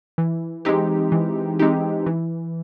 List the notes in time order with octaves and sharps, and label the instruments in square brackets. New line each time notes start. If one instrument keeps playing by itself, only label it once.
[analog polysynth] E3
G#3 C4 D#4 G4
E3
G#3 C4 D#4 G4
E3